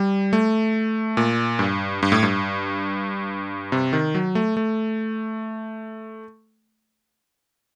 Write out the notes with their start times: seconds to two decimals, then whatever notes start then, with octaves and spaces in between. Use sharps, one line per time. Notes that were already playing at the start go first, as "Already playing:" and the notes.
Already playing: G3
0.33 A3
1.17 A#2
1.59 G2
2.03 G2
2.12 A2
2.23 G2
3.72 C3
3.93 D#3
4.15 F#3
4.35 A3
4.57 A3